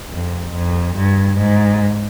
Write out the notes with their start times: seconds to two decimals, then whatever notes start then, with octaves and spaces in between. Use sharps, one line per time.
0.11 F2
0.53 F2
0.96 G2
1.38 G#2